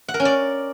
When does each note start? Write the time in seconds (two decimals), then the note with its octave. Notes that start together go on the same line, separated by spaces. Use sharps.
0.08 F#5
0.14 A#4
0.20 C#4
0.25 D5